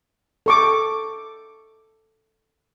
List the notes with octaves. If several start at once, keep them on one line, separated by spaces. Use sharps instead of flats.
A4 C#6 D6